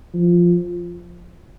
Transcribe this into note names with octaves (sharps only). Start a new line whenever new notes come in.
F3